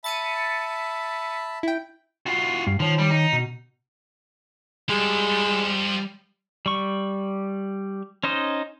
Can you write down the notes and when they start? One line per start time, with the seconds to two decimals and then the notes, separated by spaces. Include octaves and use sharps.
0.04 E5 A5 B5 A6 C#7 D#7
1.63 E4 G5
2.26 F4 F#4
2.67 G2
2.80 D#3 F3 C#5
2.98 G3
3.10 D#4
3.33 B2
4.89 F3 G3 G#3 A4
6.66 G3 C#6
8.23 C#4 D#4 C5 D#5